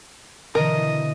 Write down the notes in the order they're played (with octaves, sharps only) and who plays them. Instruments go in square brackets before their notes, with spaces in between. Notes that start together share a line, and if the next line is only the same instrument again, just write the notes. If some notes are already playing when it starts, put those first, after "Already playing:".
[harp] B2 D3 E3 [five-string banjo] A#4 [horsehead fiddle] D#5